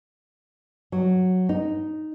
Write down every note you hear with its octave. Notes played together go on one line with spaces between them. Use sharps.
F#3
D#4